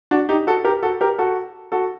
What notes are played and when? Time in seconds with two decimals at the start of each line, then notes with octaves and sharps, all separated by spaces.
0.11 D4 F#4
0.29 D#4 G4
0.47 F#4 A4
0.64 G4 A#4
0.83 F#4 A4
1.01 G4 A#4
1.18 F#4 A4
1.72 F#4 A4